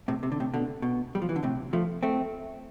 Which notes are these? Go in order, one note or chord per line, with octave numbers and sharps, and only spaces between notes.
A2 C3
C3
D3
A2 C3
B2 D3
B2
G3
F3
E3
D3
A2 C3
F3 A3
A3 C4